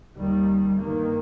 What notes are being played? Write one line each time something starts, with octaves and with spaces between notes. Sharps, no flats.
D#2 D#3 G3
G2 D#3 A#3